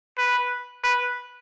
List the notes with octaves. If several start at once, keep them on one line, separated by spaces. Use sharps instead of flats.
B4
B4